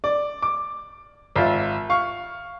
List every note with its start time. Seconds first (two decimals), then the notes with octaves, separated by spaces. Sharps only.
0.04 D5
0.42 D6
1.36 G#1 F4 E5
1.89 F5 C#6